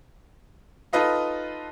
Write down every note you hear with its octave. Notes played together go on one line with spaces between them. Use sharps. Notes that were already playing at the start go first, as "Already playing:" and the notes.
D#4 F4 A4 B4 D#5 F5